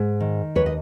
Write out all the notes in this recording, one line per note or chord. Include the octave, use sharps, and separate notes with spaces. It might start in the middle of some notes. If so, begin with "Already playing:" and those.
Already playing: G#2
D#3
D#2 B4 C#5
D#5